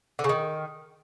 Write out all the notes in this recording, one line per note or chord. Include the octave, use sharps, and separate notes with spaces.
D3
C#3
D#3